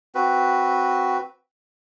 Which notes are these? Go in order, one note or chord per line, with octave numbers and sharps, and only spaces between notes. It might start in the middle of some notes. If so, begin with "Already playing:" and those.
C4 F#4 B4